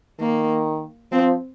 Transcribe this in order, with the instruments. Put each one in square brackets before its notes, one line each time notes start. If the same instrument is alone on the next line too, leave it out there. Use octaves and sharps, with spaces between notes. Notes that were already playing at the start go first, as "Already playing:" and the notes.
[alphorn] D#3 [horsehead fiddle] A#3
[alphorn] F3 [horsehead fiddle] C4